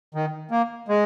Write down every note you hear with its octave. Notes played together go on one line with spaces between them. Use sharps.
D#3
A#3
G#3